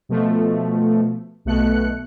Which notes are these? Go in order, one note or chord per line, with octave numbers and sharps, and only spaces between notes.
B2 F3 A3
B1 B2 A3 F#6 C#7